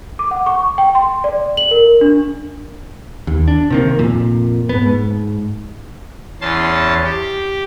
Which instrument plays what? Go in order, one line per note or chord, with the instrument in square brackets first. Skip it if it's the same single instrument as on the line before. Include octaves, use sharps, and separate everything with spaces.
[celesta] D6
F#5
C#6
G5
C6
D5
F#7
A#4
D4
[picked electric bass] D#2
D4
C3 D#3 A#3
F2 A#2
G#2 B3
G#2
[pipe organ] E2 C#4 A5 C6
G4